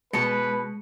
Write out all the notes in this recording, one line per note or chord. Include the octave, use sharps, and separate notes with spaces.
B2 G#3 B4 A5 C#7